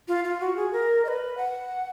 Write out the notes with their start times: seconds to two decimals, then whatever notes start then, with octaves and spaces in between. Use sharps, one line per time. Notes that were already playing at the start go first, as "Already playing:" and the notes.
0.08 F4
0.24 F4
0.40 F#4
0.56 G#4
0.73 A#4
1.05 D#5
1.08 B4
1.37 F#5